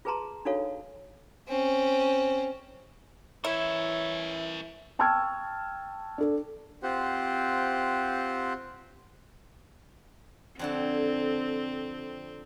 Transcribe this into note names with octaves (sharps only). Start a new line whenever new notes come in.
F4 G#4 B4 A5 A#5 C6
D4 D#4 F#4 A4 C#5 F5
C4 C#4
E3 E4 A#4 C#5 E5
G5 A5 C#6 E6 F6 G#6
D4 A4
C4 F4 G4 C5 F#5
F2 D3 C4 A5